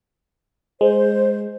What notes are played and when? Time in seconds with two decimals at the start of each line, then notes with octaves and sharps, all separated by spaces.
0.81 G#3 C5